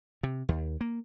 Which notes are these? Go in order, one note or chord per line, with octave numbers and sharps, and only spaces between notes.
C3
D#2
A#3